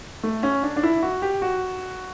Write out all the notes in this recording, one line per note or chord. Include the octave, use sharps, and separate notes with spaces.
A3
C#4
D4
D4
E4
F#4
G4
F#4